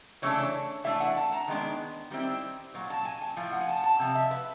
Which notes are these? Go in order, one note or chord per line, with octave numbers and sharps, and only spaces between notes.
C#3 E3 A3 D4 C#5
E3 A3 D4 E5
F#5
A5
A#5
D#3 G#3 B3 D4
D#3 G3 C4 E4
A#2 F#3
A5
G#5
G#5
A2 F3
F#5
G#5
A5
A5
C3 F3
E5
B4